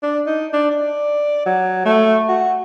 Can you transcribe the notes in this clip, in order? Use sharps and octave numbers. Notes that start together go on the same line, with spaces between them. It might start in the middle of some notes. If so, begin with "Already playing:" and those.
D4
D#4
D4
D5
F#3
A3
F#4